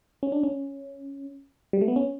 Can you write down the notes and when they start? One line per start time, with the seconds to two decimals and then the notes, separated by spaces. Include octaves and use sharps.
0.23 C#4
0.32 D4
0.43 C#4
1.73 G3
1.81 A3
1.88 B3
1.96 C#4